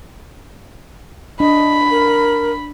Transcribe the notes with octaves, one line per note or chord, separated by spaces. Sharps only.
D4 D#5 B5
A#4